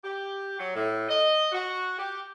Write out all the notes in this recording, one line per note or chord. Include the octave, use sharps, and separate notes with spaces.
G4
F#3
A2
D#5
F#4
G4